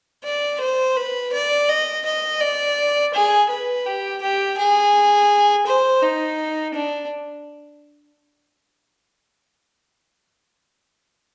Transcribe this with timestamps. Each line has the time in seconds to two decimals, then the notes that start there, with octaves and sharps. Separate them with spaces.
0.24 D5
0.61 C5
0.96 B4
1.33 D5
1.69 D#5
2.05 D#5
2.41 D5
3.14 G#4
3.50 B4
3.86 G4
4.22 G4
4.58 G#4
5.67 C5
6.02 D#4
6.74 D4